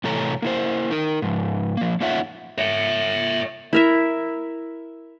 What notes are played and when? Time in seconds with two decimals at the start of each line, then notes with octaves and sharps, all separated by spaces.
0.04 A2 C3 E3 A4 C#5 A#5
0.42 A#3 E4 C5
0.91 D#4 A#4
1.22 G#2 F3
1.77 F3 A#3
2.01 A#3 D#4 F4 C#5 E5 F#5
2.58 C#5 E5
3.73 E4 A#4 E5